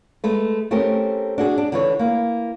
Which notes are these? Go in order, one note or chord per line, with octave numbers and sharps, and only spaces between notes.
G#3 A3 B4
A3 C4 C#4 G4 A#4
D4 F#4 G#4
D4
D3 E3 C#5
A#3 E4